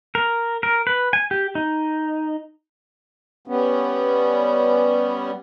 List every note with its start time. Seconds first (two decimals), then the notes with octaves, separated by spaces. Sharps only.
0.15 A#4
0.63 A#4
0.87 B4
1.13 G#5
1.31 G4
1.55 D#4
3.47 G3 B3 C#4